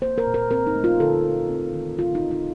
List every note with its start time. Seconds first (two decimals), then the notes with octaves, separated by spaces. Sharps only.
0.02 A#3 C5
0.18 A#4
0.26 A#2
0.34 A#4
0.51 C4 A#4
0.67 D#4
0.76 A3
0.84 F4
1.00 D3 A4
1.25 D3
1.49 C4
1.74 D#3
1.98 C3 F4
2.15 D#4
2.23 C4
2.31 D#4